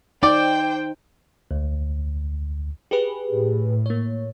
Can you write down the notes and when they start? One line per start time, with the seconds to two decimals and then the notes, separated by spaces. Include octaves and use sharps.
0.23 D#4 C5 D5 G5
1.51 D2
2.91 G4 G#4 B4
3.31 A2
3.86 A#3 C#5